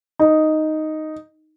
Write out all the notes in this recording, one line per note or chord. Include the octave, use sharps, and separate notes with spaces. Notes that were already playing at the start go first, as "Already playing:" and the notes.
D#4